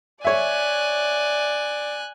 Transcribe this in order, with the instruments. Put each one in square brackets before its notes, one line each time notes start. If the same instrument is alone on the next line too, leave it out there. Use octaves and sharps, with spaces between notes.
[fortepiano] C#5 E5 [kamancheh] D5 [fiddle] G#5 F#6